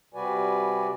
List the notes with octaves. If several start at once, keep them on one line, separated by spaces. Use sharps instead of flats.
C3 G3 F#4 B4 D5 G#5